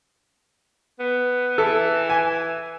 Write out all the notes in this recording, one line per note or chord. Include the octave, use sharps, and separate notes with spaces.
B3
E3 A4
G#5